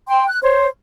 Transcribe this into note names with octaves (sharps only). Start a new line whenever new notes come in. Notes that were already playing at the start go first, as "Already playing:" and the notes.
G5 C6
F#6
C5 C#5